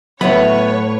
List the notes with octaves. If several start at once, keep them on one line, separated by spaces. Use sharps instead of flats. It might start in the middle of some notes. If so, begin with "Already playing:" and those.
A2 F#3 B3 B4 C#5 E5 B5